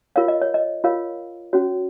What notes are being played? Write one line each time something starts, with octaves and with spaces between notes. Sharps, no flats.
F4 A#4 C#5 F5
D#5
C#5
D#5
F4 A#4 C#5 F5
C#4 F#4 C#5